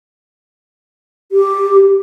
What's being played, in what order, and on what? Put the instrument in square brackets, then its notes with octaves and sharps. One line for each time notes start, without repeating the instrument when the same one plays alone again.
[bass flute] G4